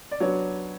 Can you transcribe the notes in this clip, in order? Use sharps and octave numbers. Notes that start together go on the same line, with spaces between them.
D5
F#3 B3 D4 C#5